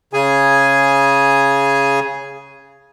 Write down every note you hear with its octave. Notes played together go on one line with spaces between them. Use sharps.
C#3 G#4 G#5